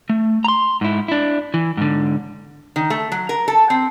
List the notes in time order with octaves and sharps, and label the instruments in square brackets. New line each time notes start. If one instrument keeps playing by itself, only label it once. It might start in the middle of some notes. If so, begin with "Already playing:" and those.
[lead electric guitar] A3
A#5 C6
G#2 E4
D4 E4
E3
G#2 D3
[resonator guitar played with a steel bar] D#3
A3
F#3
A#4
A4
C4